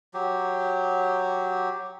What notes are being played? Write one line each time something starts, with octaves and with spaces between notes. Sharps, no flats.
F#3 G4